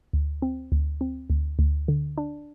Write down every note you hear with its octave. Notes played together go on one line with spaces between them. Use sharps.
D2
C4
D2
C4
D2
D2
D3
D4